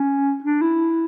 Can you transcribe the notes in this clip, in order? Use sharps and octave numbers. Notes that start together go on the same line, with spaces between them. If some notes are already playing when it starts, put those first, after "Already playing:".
Already playing: C#4
D4
E4